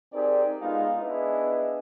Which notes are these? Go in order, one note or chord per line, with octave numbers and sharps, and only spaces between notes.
C4 D#4 G4 G#4 A#4 D5
G#3 B3 D#4 F4 F5
B3 D4 E4 G#4 B4 D#5